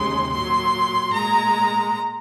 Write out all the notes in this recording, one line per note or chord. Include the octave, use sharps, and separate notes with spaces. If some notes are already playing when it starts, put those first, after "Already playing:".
Already playing: D#2 C#3 G#3 C6
A#2 F#3 C6
A#2 G#3 A#5